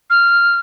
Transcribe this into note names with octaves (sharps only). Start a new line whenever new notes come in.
F6